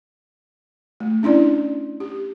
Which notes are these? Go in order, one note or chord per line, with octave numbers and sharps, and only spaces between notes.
A3
C#4 D4 E4 D5
G4